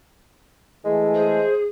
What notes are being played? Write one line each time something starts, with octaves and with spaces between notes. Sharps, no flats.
E3 G#3 A3
G#4 C5